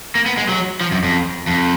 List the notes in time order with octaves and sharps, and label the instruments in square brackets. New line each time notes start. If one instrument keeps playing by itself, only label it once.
[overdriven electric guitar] A#3
B3
G#3
F#3
F3
F#2
F2
F2